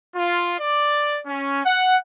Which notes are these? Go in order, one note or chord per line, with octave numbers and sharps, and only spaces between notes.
F4
D5
C#4
F#5